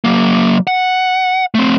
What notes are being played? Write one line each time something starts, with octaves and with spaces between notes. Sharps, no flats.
F#3 A#3
F#5
A3 C4